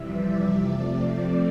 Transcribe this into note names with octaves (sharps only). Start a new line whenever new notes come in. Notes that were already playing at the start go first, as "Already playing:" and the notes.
Already playing: F2 C3 E3 G3 E5
D5
C3 F3 A3 C4 D5